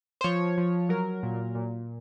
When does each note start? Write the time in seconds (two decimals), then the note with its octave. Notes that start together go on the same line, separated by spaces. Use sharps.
0.21 C5
0.24 F3 C#5
0.58 F3
0.89 F#3 A#4
1.23 A#2
1.55 A#2